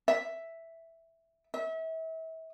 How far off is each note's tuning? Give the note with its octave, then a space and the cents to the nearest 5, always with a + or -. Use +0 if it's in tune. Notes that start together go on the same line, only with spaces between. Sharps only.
E5 +0
E5 -35